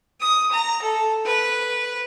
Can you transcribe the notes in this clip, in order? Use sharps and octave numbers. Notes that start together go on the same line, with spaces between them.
D#6
A#5
A4
B4